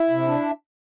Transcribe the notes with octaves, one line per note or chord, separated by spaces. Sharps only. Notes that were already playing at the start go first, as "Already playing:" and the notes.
Already playing: E4 E5
C3
D4